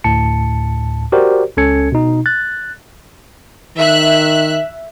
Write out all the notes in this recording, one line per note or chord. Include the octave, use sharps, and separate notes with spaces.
D2 A2 A5 C#7
F#4 G4 A#4 C5 D5
C#2 C#4 A4 G#6 C#7
B2 D#4
F#6 A6
D#3 E5 F#6